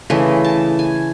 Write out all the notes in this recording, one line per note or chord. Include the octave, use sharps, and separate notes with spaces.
C#3 E3 A3 D#5
A5
G#5